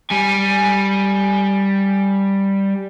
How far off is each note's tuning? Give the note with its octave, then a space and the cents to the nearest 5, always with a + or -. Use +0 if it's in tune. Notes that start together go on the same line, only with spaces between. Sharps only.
G3 +0 G#5 +0